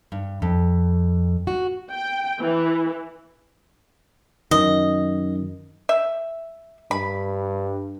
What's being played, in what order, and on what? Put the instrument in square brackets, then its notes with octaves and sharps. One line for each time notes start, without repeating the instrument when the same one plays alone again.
[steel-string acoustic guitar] G2
F2
F#4
[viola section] G5
E3
[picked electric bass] F#2 D#3 [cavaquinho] D#5
[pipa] E5
[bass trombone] G2 [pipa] B5